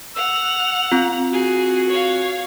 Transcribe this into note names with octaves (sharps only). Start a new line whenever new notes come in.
F#5 E6 F7
C4 F4
F#4 G#4
C#5 F5